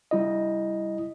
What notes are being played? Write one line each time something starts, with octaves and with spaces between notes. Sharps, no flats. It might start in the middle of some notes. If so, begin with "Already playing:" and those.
G3 E4 D#5